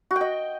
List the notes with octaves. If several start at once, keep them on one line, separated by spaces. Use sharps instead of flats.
F#4
G5
D#5